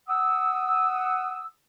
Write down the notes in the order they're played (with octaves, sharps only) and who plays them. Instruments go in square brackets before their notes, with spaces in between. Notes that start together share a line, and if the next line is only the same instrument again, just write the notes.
[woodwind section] F#5 D#6 E6